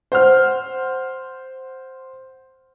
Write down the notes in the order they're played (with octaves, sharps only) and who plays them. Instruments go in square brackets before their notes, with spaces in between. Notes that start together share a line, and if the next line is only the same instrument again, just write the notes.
[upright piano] C5 F#5 F6